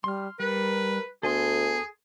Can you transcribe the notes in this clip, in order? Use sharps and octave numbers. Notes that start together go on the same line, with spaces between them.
G3 C6 F6
G3 A#4 B4
D2 B3 G#4 A4 G#5 C6